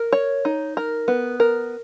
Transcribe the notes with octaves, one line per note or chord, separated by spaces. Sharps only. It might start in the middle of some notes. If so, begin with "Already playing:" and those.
Already playing: A#4
C#5
D#4
A#4
B3
A#4